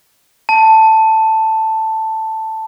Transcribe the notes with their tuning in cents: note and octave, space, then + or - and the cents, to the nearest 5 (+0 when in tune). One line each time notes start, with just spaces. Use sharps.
A5 +5